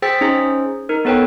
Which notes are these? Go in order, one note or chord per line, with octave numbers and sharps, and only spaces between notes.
G#4 C5 G5 E6 A6 B6
C#4 D#4 G#4 C5
D#4 A#4
B3 A4 B4 C#5 G5